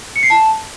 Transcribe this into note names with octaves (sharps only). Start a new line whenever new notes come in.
C#7
C7
A5